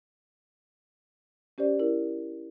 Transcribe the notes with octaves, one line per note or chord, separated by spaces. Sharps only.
C#4 G4 C5 D5
E4 A#4